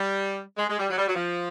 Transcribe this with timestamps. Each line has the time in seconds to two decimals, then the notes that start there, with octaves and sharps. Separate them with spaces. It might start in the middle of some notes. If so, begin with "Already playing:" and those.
Already playing: G3
0.58 G#3
0.69 G#3
0.79 G3
0.90 F#3
0.98 G3
1.07 F#3
1.15 F3